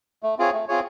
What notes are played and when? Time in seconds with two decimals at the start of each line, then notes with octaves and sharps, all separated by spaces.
0.23 A3
0.38 C4 F4 G#4 C#5
0.53 A3
0.68 C4 F4 G#4 C#5